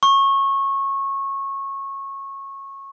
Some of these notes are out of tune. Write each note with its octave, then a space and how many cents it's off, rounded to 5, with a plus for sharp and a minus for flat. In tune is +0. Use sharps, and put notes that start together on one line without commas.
C#6 -20